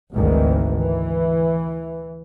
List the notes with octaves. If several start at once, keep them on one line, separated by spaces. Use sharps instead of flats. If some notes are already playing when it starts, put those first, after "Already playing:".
G#1 D2 G#2 D#3 E3
E3